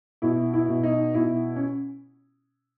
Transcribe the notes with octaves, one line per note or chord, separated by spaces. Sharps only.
B2 E4
E4
B2
D#4
B2 E4
C#4